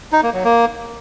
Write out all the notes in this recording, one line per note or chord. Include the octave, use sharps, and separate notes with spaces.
D#4
A#3
F#3
A#3